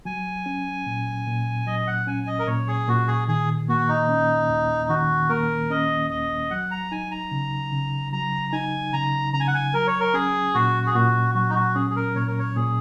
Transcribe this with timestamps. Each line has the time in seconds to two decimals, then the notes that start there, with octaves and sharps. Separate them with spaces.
0.05 F#3 G#5
0.46 C#4
0.86 A#2
1.26 A#2
1.67 F#3 D#5
1.87 F#5
2.07 C#4 G#5
2.27 D#5
2.39 A#4
2.47 A#2 C#5
2.68 G#4
2.88 A#2 F#4
3.08 G#4
3.28 D#3 G#4
3.68 A#3 F#4
3.89 D#4
4.09 C#4
4.50 D#2
4.89 D#3 F#4
5.29 A#3 A#4
5.70 C#4 D#5
6.10 D#2 D#5
6.51 F#3 F#5
6.71 A#5
6.92 D#4 G#5
7.11 A#5
7.31 C#3
7.72 C#3
8.12 F#3 A#5
8.53 D#4 G#5
8.93 C#3 A#5
9.33 C#3 A#5
9.40 G#5
9.48 F#5
9.54 G#5
9.74 F#3 A#4
9.87 C#5
10.00 A#4
10.14 C#4 G#4
10.55 A#2 F#4
10.87 G#4
10.95 A#2 F#4
11.35 F#3 F#4
11.49 D#4
11.55 F#4
11.75 C#4 G#4
11.90 G#4
11.96 A#4
12.15 A#2 C#5
12.28 A#4
12.39 C#5
12.56 A#2 G#4